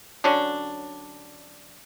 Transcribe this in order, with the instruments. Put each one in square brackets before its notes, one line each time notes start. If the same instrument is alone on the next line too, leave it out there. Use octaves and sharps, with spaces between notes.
[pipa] D3 F#3 C#4 D4